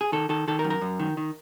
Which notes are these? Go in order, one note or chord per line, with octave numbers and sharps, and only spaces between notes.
G#4
D#3 A4
D#3 A4
D#3 A4
A#4
F#2
A#4
F#2
D#3
D#3